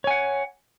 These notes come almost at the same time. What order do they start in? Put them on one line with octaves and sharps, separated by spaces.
C#5 G#5 F#5